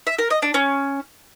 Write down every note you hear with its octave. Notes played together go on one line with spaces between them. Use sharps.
E5
A#4
D#5
D4
C#4